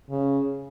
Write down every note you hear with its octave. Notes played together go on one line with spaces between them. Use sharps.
C#3